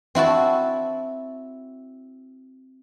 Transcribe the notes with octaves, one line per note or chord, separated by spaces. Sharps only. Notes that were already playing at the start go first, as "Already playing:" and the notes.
C4 E4 F#4 A5